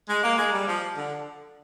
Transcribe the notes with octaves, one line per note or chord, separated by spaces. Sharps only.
G#3
A#3
G#3
G3
F3
D3